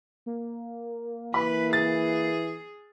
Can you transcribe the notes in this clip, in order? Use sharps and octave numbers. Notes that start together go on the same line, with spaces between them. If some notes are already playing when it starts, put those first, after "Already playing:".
A#3
E3 B4 B5
G#4 A6